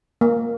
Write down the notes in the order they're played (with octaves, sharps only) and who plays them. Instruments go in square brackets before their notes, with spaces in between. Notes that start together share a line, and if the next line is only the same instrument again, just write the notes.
[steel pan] A#3